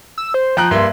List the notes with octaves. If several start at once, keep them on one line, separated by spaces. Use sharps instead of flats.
E6
C5
F3 G5 A#5 F#6
G2 A#3 E5 C6